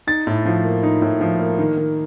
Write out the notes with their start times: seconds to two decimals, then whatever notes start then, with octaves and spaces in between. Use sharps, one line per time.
0.07 D#4 A6
0.27 A2
0.46 F3
0.64 A#3
0.83 D#4
1.02 A2
1.21 F3
1.40 A#3
1.59 D#3
1.77 D#3